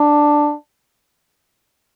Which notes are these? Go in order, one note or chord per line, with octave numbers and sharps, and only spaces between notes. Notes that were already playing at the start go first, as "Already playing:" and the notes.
Already playing: D4